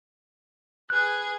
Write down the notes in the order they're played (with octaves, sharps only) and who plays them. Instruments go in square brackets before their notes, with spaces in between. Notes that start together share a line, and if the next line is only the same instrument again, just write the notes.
[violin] G#4 B4 [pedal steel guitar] F#6